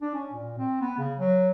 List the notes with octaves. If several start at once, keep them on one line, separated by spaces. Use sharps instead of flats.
D4
C#4
A#2
C4
B3
C#3
F#3